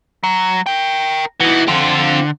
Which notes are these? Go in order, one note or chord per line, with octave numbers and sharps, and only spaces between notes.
F#3
A#4 G5
E3 D#4 F#4
D3 C4 F4